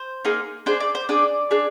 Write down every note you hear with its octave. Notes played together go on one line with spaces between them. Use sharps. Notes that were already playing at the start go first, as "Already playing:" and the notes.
Already playing: C5
A#3 D#4 G#4
D4 G#4 C5
D5
C5
D4 G#4 D5
D4 G#4